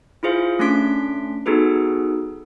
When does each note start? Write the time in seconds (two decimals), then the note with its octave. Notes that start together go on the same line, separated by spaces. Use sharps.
0.23 E4 F4 G#4 C5 F5
0.59 A3 C#4 D4 C6 B6 D7
1.46 B3 D#4 F#4 G#4 A4 B4